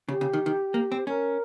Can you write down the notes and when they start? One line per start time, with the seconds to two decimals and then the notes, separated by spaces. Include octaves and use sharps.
0.08 C#3 G4
0.21 C#3
0.33 D#3
0.46 D#3
0.74 A#3
0.92 C4
1.07 C#4 A#4